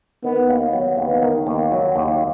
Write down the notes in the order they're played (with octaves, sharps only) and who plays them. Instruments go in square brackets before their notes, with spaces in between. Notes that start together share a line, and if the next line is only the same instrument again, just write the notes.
[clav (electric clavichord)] D#3 [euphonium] B3
[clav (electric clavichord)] D#2
F#3
[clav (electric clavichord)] D#2 [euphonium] B3
[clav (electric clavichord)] D#3
D#2
F#3
D#2